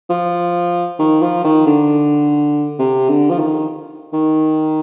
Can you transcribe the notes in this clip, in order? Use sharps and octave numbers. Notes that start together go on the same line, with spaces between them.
F3
D#3
F3
D#3
D3
C3
D3
F3
D#3
D#3